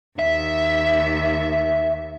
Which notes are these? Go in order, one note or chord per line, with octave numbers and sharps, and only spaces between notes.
D#2 E5